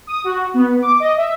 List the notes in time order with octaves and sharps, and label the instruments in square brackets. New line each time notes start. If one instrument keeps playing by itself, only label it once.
[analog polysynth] D#6
F#4
B3
D6
D#5
E5